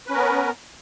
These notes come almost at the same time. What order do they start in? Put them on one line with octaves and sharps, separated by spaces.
B4 C#4 A#4 B3